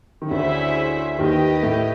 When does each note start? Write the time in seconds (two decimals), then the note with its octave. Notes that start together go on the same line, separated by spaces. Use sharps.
0.22 D#3
0.31 D2 D3 C#4 E4 G#4 C5 E5
1.18 D#2 D#3 G4 B4 D#5
1.63 A2 A3